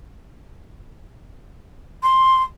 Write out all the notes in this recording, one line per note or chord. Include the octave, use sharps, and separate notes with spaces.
C6